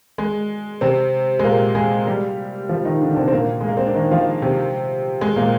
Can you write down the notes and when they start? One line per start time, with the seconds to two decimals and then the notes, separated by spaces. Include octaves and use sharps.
0.18 G#3
0.81 C3 C4
1.39 G#3
1.44 A#2 A#3
1.75 G#3 G#4
2.07 G3 G4
2.69 F3 F4
2.85 D#3 D#4
3.01 D3 D4
3.11 D4
3.16 C3 C4
3.28 C4
3.32 A#2 A#3
3.61 G#3
3.68 A#3
3.77 C4
3.87 D4
3.95 D#3 D#4
4.11 F3 F4
4.42 C3 C4
5.21 G#3
5.36 A#2 A#3